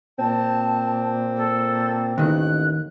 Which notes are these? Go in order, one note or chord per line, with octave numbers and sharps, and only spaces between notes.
A#2 C4 A5
A4
A1 D#2 D#3 F#6